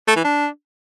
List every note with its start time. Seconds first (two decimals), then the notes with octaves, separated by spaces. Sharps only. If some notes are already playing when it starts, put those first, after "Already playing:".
0.08 A3
0.16 E3
0.25 D4